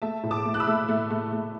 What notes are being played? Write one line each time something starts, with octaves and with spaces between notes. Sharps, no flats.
A3 E5 A5
A2
A5 D6
A3
F#6
B5 E6
A3
A3
A3
A3